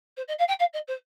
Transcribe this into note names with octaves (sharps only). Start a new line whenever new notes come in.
C5
D#5
F5
G5
F5
D#5
C5